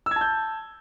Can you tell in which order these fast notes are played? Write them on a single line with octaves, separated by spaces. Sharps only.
E6 G#6 A5 G6